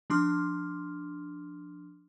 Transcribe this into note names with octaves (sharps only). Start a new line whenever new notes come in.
F3 D4 C6 D6 F6